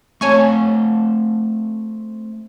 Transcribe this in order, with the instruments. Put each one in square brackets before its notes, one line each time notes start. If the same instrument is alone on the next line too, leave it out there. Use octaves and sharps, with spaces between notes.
[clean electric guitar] A3 C4 A5 [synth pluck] C#5 G#5 C#6